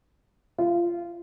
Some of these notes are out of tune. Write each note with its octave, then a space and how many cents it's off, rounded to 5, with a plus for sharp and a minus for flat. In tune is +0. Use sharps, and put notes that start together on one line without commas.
F4 -20